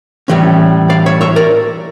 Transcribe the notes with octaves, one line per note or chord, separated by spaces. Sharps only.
A2 E3 G3 C#4
D5 F5
C#5 E5
C#5 E5
A#4 D5